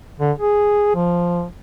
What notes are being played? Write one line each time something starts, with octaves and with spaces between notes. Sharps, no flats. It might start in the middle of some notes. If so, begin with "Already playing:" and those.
D3
G#4
F3